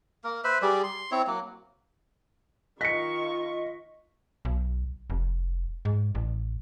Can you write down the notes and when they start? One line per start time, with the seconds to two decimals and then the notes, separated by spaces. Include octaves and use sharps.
0.24 A#3 A#4
0.44 B4 C5 E5
0.62 G3 G#4 D5
0.84 C6
1.11 C4 E4 C#5
1.27 F#3 A#3
2.81 D#3 F4 D#5 C#6 B6 C#7
4.45 B1
5.10 F1
5.85 G#2
6.15 A1